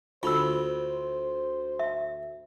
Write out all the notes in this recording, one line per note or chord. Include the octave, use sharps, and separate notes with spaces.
D2 D3 F4 C5 B5 E6
E5